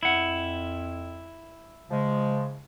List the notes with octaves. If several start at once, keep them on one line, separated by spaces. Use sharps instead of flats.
F2 E4 F#5
C#3 F3 G#3